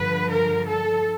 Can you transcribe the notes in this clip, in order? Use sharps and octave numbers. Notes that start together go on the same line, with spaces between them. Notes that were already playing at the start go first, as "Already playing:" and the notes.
Already playing: G2 D3 F3 B4
A#4
A4